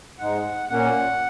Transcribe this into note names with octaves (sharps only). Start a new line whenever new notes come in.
G#2 G#3 D#4 F#5
A#2 A#3 C#4 F#5